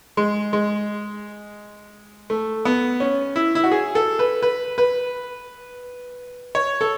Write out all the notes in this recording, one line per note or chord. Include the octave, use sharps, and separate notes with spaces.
G#3
G#3
A3
B3
C#4
E4
E4
F#4
G#4
A4
B4
B4
B4
C#5
A4